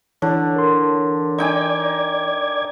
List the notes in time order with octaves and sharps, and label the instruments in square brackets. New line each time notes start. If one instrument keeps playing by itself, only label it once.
[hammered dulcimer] D3 [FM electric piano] E3 C#5 A5
[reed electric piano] A#4 C6
[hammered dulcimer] D#4 G5 G#5 [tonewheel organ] D5 G#6